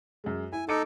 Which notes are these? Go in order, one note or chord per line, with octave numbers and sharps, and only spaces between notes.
F#2 G#3
E4 G#5
D#4 A4 D6 C#7 D7